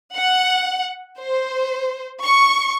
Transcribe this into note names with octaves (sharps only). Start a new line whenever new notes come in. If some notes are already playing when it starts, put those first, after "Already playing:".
F#5
C5
C#6